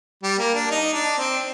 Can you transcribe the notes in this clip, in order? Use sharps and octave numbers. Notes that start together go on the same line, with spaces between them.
G3
A#3
D4
D#4
D4
C4